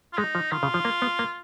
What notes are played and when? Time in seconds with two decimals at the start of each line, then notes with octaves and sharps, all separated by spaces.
0.13 F4
0.18 G#3 D#4
0.35 F3
0.51 D#3 F4
0.63 C#3
0.74 F3
0.85 A#3
1.02 B3
1.19 A#3